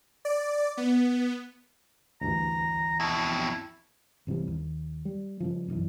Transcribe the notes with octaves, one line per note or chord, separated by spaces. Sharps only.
D5
B3
D2 G2 E3 A#5
F2 B2 E4
G1 C3 E3 G3
D#2
G3
G2 C#3 F3
B1 F#2 D#3 E3